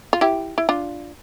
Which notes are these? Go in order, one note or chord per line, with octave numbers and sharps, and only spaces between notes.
F4
E4 G4
E4
D4 F4